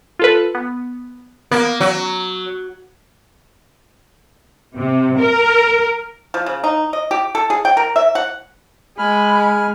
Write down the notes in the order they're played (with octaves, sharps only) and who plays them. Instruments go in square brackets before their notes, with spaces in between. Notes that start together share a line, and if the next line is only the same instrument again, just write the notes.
[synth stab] F4 A4 B4
B3
[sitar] A#3 [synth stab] B3
[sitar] F#3
[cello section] C3
A#4
[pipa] F3
C#3
D#4
D#5
G4
A4
G#4
G5
A#4
E5
F#5
[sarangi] G#3 [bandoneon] G#5 F6 [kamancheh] B5